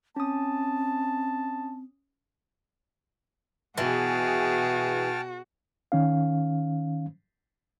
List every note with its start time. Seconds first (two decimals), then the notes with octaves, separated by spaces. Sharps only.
0.16 C4 C#4 A5 D#6
3.78 B2 E3 F#4 G#4 G5 A5 F6
5.92 D#3 C#4 F5